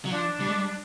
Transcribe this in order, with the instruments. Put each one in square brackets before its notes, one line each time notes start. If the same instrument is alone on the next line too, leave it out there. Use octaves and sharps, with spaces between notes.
[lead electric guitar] F#3
[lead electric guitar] F3 [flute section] D4
[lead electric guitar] G3
G#3
G3